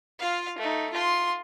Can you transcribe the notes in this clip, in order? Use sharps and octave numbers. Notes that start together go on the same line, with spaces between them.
F4 F5
A3 D#4
F4 C6